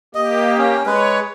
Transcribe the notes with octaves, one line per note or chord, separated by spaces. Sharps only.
A#3 G4 D#5
C#4
G#3 B4 C#5